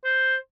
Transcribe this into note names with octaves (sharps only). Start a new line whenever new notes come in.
C5